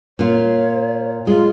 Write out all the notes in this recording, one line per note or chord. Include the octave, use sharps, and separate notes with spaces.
A#2 F4 C#5
G#3 F4